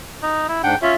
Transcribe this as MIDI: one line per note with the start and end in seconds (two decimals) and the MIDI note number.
0.23 0.46 63
0.48 0.63 64
0.63 0.75 44
0.63 0.75 62
0.63 0.75 78
0.63 0.76 79
0.82 0.94 61
0.82 0.96 65
0.82 0.96 76